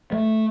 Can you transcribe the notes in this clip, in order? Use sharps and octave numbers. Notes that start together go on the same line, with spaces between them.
A3